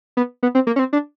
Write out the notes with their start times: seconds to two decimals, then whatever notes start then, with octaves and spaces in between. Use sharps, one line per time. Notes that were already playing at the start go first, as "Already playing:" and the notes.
0.17 B3
0.43 B3
0.55 C4
0.67 A#3
0.76 C#4
0.79 C4
0.93 D4